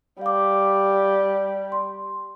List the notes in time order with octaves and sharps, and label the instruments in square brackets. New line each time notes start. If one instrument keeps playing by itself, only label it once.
[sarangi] G3 [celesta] F5 D6
[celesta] C6